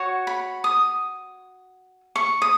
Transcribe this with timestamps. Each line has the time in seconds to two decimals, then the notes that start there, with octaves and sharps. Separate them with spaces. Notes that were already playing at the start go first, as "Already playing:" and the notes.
Already playing: F#4 C#5
0.27 B5
0.64 D#6
2.16 C#6
2.42 D#6